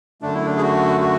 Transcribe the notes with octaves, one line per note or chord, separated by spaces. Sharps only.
F#2 D3 A3 D4
E4
D4
G#4
F#4
F#4